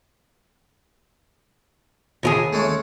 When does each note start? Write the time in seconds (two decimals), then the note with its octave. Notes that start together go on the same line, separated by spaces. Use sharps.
2.23 D#2 F4 G#4
2.53 G#3 A3 C#4